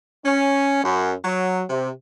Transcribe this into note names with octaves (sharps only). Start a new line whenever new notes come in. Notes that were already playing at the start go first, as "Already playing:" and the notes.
C#4
F#2
F#3
C3